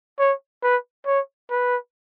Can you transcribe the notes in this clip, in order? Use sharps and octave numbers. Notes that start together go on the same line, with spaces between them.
C#5
B4
C#5
B4